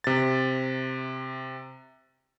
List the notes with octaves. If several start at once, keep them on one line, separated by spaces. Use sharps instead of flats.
C3 A6